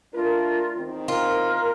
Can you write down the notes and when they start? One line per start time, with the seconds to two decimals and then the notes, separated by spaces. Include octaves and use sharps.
0.14 A3 D4 F4 A#4
0.78 E2 D#3 C4
1.08 F4 A#4